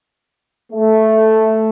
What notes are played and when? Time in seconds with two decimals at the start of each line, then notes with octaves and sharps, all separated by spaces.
0.73 A3